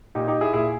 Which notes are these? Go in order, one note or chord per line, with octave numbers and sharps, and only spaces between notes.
A#2 D#4 G4
D#4 G4
E4 G#4
A#2 E4 G#4